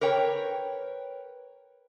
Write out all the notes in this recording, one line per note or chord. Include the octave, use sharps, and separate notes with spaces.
A#4 B4 C#5 G5